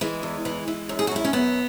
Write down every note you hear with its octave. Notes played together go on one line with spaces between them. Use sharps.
E3 G#3
E2
E3
E3
F#2
G#4
F#4
F#2 E4
C#4
F#2 B3